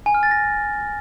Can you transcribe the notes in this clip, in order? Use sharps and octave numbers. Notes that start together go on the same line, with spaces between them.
G#5
F6
A6
A#6